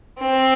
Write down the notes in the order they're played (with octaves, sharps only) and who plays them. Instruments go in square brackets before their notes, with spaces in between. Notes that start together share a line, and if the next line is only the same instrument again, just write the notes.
[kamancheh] C4